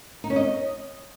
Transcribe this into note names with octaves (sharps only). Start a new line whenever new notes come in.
D#4
C#4
D#5